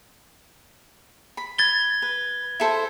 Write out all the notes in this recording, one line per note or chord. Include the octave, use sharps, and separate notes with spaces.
B5
G#6 A6 G7
B4
E4 A4 C5